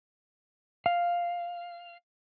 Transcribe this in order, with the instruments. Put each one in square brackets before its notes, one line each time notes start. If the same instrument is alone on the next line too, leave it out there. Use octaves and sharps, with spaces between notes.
[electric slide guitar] F5